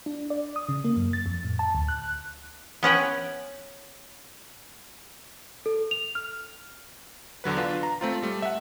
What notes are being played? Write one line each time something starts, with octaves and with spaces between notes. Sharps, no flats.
D4
D5
D#6
C#3
A#3
F#2
A6
F2
A2
A5
D2
F#6
B3 C#4 F#5 G5
A4
F7
F6
E2 D3 F#3 B4
D4 F4 B4
A#5
A3 C4 F4
G3 A3
E5 F#5